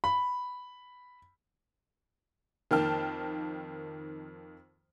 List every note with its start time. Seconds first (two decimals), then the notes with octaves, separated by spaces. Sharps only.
0.04 B5
2.71 F2 D#3 A#3 G5 A5 F6